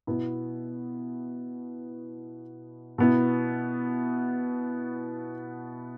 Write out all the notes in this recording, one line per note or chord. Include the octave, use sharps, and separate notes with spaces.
B2 B3 E4
B2 B3 E4